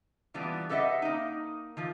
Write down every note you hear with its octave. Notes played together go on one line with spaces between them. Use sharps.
A#2 E3 G3 B3 D4
G4 A4 B4 D#5 E5 F#5
A#3 D#4
D#3 F3